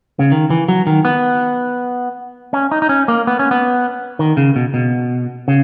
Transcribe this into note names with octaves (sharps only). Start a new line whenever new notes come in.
C#3
D#3
E3
F#3
D#3
B3
C#4
D#4
D#4
C#4
A#3
B3
C#4
B3
D#3
C#3
B2
B2
C#3